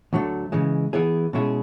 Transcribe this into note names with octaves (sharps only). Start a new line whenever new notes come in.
D2 D3 F#3 A3
C#3 E3 G#3
E3 B3 E4 G#4
B2 G#3 C#4 E4 G#4